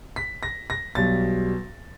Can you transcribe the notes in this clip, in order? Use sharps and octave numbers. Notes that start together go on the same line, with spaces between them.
B6
A#6
A#6
B1 B2 G3 A6